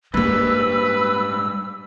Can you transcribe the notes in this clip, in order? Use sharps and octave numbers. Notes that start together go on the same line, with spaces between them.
G#2 G3 G#3 A#3 B4 E6